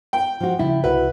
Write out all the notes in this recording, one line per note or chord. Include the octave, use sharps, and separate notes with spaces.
G5
F3 F#4
C#3 F3 G3 E4
C2 E4 F#4 B4